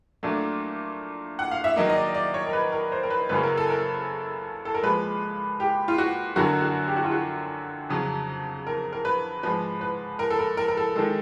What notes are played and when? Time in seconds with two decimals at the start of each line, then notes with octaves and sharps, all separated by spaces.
0.23 A#2 F#3 A3 D4
1.39 F#5
1.51 F5
1.64 E5
1.76 D#3 F#3 A#3 D#5
1.89 D#5
1.96 D5
2.14 D5
2.34 C#5
2.47 A#4
2.53 B4
2.72 A#4
2.92 C5
3.03 A#4
3.10 B4
3.29 F#2 C#3 F#3 A#3 C#4 B4
3.43 A#4
3.57 A4
3.70 A#4
4.65 A4
4.74 A#4
4.82 A#2 F3 G#3 B4
5.60 G4
5.88 F4
5.98 F#4
6.36 F#2 D3 F#3 A#3 F#4
6.62 F#4
6.87 G4
6.96 F#4
7.04 F4
7.12 F#4
7.89 F2 C#3 F#3
8.67 A#4
8.93 A#4
9.05 B4
9.43 G#2 F3 G#3 B4
9.81 B4
10.19 A#4
10.30 A4
10.39 A#4
10.57 A#4
10.68 A#4
10.77 A4
10.96 D#3 G#3 A4